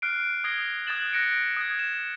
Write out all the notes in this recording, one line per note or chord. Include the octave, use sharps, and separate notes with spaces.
F6 F#6 C7 D7
D#6 G#6 A#6 C7 G7
D#6 F#6 G#6 A6 E7 F#7
F#6 A#6 C#7 D7
D#6 F#6 G#6
E7